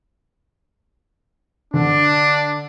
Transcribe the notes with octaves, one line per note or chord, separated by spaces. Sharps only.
D3 D4